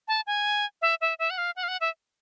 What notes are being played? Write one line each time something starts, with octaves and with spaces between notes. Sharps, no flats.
A5
G#5
E5
E5
E5
F#5
F5
F#5
F5
F#5
E5